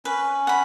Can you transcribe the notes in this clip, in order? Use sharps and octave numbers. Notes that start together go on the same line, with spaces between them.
C#4 B4
F#5 B5